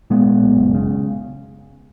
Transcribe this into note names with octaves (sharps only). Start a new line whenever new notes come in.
A#2 G#3 B3
A#2
B1
F#1
C#3